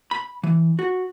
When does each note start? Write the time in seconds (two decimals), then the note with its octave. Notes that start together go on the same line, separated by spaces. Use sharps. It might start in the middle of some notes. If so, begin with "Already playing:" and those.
0.11 B5
0.43 E3
0.79 F#4